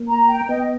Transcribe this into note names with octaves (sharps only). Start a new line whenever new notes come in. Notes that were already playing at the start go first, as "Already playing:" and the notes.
Already playing: A#3
A#5
G5
B3 D#5